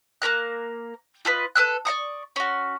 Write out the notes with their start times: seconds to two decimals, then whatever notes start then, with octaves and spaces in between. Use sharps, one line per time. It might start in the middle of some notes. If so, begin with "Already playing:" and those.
0.22 A#3 C#4 A#4 F#6
1.25 F4 A4 B4 D#5
1.56 A4 B4 E6 F#6
1.85 D5 D#5 C#6 D#6
2.36 C#4 F#4